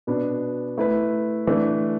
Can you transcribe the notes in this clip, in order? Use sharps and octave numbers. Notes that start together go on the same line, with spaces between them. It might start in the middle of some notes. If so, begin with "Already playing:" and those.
B2 B3 D4
A3 E4 B4
E3 A3 D4